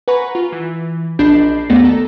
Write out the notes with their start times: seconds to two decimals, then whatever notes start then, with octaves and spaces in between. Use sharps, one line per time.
0.08 B4 F#5 G#5 A#5 B5 C#6
0.35 F4
0.52 E3
1.19 A#1 D4 D#5 B5 G6 C7
1.69 G#1 D#2 A3 B3 D5 A#6
1.85 A4 A#5